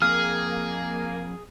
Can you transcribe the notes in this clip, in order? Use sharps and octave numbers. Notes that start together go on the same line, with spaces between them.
F2 A#3 G#4 F6